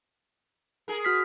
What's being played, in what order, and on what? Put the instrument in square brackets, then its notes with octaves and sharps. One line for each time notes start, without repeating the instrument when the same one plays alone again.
[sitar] G#4 A#4
[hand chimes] F#4 F6 B6